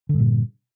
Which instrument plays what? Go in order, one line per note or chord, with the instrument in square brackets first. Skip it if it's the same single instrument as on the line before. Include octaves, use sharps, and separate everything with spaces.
[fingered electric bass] D3
G2
A#2